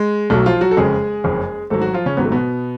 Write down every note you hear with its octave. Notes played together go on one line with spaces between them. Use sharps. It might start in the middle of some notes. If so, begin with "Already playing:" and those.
Already playing: G#3
B1 B2 F#3 A3
F3 F4
F#3 F#4
A4
F#1 F2 C#3 G#3 G#4
F#1 F2 C#3
G#1 G#2 F#3 A3 A4
F#3 F#4
F3 F4
C#3 C#4
G#1 G#2 F#3 B3
A3
B2 B3